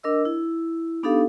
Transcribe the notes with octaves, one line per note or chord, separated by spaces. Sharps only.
D4 A#4 D#5 E6
E4
B3 D4 D#4 G4 A4 F5